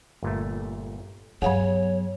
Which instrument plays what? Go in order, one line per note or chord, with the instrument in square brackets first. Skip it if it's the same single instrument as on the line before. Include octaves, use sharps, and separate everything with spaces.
[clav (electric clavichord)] G1 A#2 A3
[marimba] G2 F5 F#5 [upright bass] F#3 B3 [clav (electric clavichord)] G#4 [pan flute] C#5